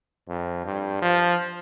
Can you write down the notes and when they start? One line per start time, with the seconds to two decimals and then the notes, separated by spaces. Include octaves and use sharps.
0.28 F2
0.65 G2
1.02 F3